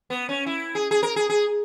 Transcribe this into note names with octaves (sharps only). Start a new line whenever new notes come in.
B3
C#4
E4
G#4
G#4
A#4
G#4
G#4